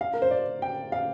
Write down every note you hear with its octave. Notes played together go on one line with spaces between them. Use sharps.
F5
A#4
C5
D5
G5
F5